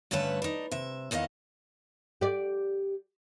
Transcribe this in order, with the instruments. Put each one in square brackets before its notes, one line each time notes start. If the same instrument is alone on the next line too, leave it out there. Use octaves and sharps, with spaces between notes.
[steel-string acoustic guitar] G2 D3 A3 C#4 B4 A5
D4 D#4
C3 E5
E2 D#3 B3 D#5 F5
[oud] G4 D5